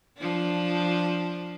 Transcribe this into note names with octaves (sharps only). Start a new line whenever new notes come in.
F3 D4